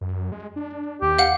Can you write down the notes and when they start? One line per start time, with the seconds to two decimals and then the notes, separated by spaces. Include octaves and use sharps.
0.01 F#2
0.32 G#3
0.56 D4
1.02 D#2 G4
1.19 F5 F#5